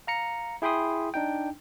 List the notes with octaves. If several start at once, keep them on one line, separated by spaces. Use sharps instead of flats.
F5 A#5 C#7
E4 G#4 G5 B5 C6 D#6
D4 D#4 G5